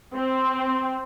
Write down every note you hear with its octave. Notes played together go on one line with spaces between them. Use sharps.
C4